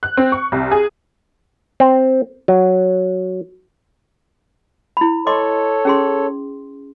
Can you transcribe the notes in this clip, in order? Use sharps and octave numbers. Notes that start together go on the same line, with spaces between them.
F#6
C4
C#6
C2
G#4
C4
F#3
E4 B5
A4 C#5 D#5 C6 D6
C#4 G#4 C6